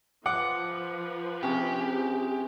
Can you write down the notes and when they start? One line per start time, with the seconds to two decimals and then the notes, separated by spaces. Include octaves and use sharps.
0.26 F3 B4 F#5 D6
1.43 C3 C#4 G4 G#4